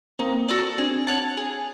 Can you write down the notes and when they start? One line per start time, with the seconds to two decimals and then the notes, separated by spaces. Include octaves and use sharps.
0.19 A#3 C4 D#4
0.48 F#4 A4 D5
0.78 C4 D4 G#4
1.07 C#5 F#5 A5
1.37 G#4